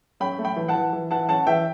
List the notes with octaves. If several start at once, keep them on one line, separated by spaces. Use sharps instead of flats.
C#4 G5 B5
A3
G5 B5
E3
F#5 A5
E3
E3
E3 F#5 A5
C#4 F#5 A5
E3 E5 G5